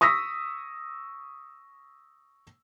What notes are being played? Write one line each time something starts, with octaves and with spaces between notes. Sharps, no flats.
C#6 D#6 E6 A#6 B6